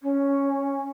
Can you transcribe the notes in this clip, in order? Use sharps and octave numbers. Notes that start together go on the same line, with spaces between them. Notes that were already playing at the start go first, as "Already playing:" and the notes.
C#4